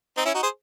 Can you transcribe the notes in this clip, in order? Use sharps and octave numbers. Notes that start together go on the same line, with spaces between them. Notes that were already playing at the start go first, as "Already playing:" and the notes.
C4 D#4
C#4 E4
D#4 F#4
G#4 C5